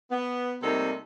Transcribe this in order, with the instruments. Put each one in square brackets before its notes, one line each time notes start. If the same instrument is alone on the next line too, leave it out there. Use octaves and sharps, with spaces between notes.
[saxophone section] B3
C3 G3 A3 A#3 D#4 A4